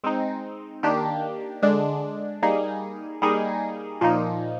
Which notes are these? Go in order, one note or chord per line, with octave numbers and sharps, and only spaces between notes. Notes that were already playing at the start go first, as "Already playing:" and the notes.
G#3 C4 D#4
D#3 A#3 D4 G4
D3 G#3 D4
G3 A#3 D#4 G#4
G3 A#3 D#4 G#4
A#2 F3 A#3 D#4